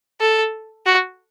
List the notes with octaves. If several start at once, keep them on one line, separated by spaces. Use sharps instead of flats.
A4
F#4